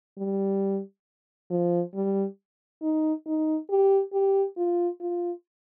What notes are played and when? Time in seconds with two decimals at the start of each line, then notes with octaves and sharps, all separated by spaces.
0.18 G3
1.50 F3
1.94 G3
2.82 D#4
3.26 D#4
3.70 G4
4.13 G4
4.57 F4
5.01 F4